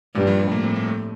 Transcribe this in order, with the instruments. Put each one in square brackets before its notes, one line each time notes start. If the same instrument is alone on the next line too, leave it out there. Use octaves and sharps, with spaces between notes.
[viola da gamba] G2 [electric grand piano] A#2
[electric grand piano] G3
F3
G3
[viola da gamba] A2 [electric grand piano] A#3
[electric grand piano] C4
A#3
A3